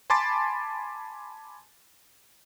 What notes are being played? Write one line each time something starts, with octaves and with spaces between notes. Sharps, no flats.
G#5 A5 B5 C6 D6 A6